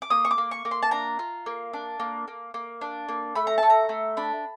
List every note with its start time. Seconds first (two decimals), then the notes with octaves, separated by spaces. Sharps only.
0.02 D6
0.10 A#3 D#6
0.25 C#6
0.31 D6
0.38 A#3
0.51 C#6
0.65 A#3
0.71 C6
0.82 A5
0.91 D4 A#5
1.19 F4
1.46 A#3
1.73 D4
2.00 A#3
2.28 A#3
2.54 A#3
2.81 D4
3.09 A#3
3.35 A3 B5
3.47 A#5
3.58 A3 A5
3.70 A#5
3.89 A3
4.17 D4 B5